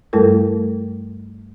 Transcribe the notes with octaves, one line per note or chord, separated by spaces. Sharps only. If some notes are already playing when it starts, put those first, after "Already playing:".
G2 G3 A3 E4 A4 A#4